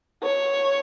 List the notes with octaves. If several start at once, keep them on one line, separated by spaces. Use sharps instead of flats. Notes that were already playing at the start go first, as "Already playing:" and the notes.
C#5